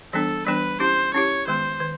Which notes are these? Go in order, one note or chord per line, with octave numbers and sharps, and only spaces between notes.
E3 G3 B3 D4 A4
E3 G3 B3 D4 B4
C#4 E4 G4 C5
C#4 E4 G4 C#5
D#3 G#3 B3 C5
D#3